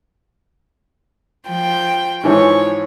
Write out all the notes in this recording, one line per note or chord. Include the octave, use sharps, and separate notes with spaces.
F3 G5
G#2 E3 F3 C#5